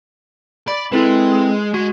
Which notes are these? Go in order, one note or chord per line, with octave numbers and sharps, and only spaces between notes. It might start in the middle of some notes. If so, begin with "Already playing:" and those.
D5 B5
G#3 C4 E4 A4 B4
G#3 F#4